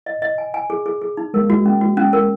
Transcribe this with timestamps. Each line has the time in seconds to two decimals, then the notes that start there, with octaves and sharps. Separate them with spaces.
0.06 D#5
0.22 D#5
0.38 G#5
0.54 G#5
0.70 G#4
0.86 G#4
1.01 G#4
1.17 D#4
1.34 G#3 A#4
1.41 A#3
1.49 G#3 F#4
1.66 C#4
1.81 F#4
1.97 C#4
2.13 A#4